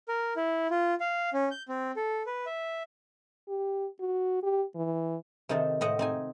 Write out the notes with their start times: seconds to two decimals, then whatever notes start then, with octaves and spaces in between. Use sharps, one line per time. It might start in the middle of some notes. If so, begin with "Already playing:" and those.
0.08 A#4
0.36 E4
0.71 F4
1.00 F5
1.33 C#4
1.51 G6
1.69 C4
1.96 A4
2.27 B4
2.46 E5
3.48 G4
4.00 F#4
4.43 G4
4.75 E3
5.49 C3 D#3 C4 D#4 A4
5.81 A2 C4 D#5 F#5
5.99 C4 D#4 G#5